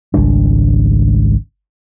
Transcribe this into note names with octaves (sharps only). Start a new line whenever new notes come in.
G#1 C#2 G3 D4